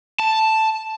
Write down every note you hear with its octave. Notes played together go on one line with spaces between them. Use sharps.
A5